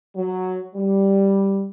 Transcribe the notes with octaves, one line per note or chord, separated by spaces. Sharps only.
F#3
G3